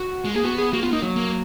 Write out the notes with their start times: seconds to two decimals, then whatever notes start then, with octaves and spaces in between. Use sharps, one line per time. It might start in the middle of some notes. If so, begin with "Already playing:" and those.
Already playing: F#4
0.25 G#3
0.35 A#3 G#4
0.43 B3 F#4
0.58 G#4
0.73 A#3 F#4
0.83 B3 F4
0.92 A#3 D#4
1.02 F#3
1.16 A#3